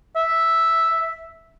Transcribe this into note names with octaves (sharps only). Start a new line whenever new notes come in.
E5